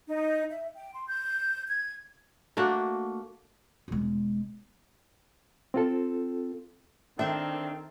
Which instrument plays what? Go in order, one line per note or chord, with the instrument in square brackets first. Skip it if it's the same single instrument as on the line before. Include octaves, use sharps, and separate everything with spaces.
[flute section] D#4
E5
G5
C6
G6
G#6
[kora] A3 A#3 D4 F#4
[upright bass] E1 G#3
[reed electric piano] C4 F4 A4
[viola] D#3 [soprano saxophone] C4 [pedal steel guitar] D4 [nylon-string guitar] A4 E5